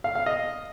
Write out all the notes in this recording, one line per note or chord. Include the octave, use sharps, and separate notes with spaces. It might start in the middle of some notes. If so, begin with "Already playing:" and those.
F5
F5
D#5